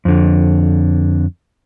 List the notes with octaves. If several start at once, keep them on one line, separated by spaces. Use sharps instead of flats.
F2 D3